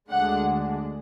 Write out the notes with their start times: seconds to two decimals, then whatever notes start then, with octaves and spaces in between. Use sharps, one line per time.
0.11 D2 D3 G#3 D4 F#5